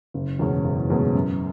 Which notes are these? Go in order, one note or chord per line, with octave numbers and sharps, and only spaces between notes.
F#1
E2 B2 G#3 C#4
F#1
E2 B2 G#3 C#4
F#2